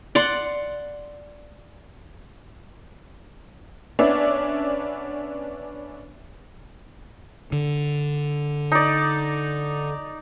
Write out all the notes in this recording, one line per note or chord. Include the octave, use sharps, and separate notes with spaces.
D5 F#5 C6
B3 C#4 D4 D5 E5
D3
D#4 D5